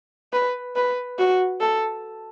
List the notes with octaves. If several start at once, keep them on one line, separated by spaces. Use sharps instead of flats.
B4
B4
F#4
A4